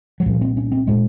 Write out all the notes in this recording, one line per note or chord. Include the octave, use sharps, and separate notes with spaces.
F#3
C2 A#2 F3
C4
C#4
C4
A#2 G#3